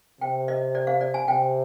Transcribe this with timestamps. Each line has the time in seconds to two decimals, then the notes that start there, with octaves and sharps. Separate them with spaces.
0.21 C3 G5
0.48 D#5
0.75 D5
0.87 F5
1.01 D5
1.14 G#5
1.28 C3 G5